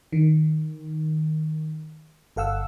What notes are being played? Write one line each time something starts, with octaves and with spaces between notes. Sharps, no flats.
D#3
G1 A4 F5 F#5 E6